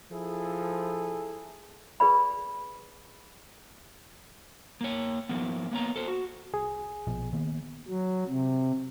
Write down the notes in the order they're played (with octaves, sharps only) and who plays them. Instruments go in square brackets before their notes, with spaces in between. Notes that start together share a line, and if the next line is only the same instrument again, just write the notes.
[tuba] F3 [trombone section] E4 G#4 A4
[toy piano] G#4 B4 D5 B5
[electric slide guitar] A#3 C#5
F3 A#3 B3
A#3 B3 C#5 A#5
A4 C5
F#4
[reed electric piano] C2 G#4
[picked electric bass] A#1 B2 F3
D#3 A#3 B3
[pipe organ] F#3
C3